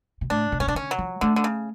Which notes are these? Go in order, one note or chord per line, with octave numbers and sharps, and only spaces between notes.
B2
A2 D4
B2
A2 C#4
B2 D4
D3 C#4
F#3
F3
D3 A3
D3
C#3